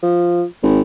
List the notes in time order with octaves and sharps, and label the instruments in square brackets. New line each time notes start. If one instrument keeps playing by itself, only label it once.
[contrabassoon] F3
G#1